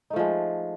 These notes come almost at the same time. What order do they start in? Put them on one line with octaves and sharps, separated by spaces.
D#4 A3 F3 G#3